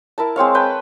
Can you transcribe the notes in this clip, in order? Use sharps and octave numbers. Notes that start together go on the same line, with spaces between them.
E4 A#4 A5
G#3 C4 C#5 F5
B4 G5 A5